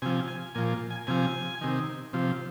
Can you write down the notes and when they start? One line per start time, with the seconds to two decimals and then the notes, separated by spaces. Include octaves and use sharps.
0.02 C3 G#5
0.06 F3
0.28 G#5
0.55 A#2 F3 G#5
0.90 G#5
1.07 C3 F3 G#5
1.61 C3 D#3
2.13 C3 F3